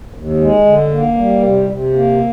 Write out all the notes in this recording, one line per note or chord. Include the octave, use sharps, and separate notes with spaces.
D#2
G#3
D3
A#3
G3
C3
C3
A#3